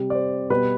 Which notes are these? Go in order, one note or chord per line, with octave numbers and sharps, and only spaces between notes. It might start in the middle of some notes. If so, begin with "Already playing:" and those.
Already playing: C3 G3
D5
C5
B2 G3 B4